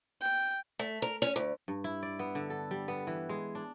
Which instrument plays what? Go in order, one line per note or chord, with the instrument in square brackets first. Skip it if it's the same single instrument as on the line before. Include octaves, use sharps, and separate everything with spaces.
[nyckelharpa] G5
[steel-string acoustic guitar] A3
A#4
C#4
D2
[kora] G2
E4
D5
B3
D3
A4
G3
B3
E3
G#3
D4